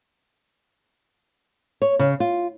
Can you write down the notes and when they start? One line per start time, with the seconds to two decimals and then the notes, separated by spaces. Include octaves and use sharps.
1.82 C#5
1.99 C#3
2.20 F4